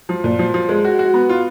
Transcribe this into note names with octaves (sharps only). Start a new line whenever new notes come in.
F3
A#2
F3
F3
G#3
F#4
F#4
B3
F4